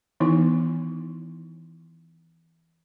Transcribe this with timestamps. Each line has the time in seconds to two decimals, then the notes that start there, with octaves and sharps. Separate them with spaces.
0.20 D#3 E3 B3 D#4 E4 C6